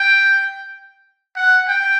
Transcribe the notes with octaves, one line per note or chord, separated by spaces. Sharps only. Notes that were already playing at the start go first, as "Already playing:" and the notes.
Already playing: G5
F#5
G5